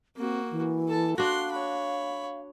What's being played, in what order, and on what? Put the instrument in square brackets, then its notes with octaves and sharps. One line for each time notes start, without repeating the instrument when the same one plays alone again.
[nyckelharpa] A#3 F#4 [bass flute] C4
[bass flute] E3
[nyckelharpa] A4 A5
[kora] D4 F#4 [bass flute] F5 [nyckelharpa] C6
[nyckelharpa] C#5 B5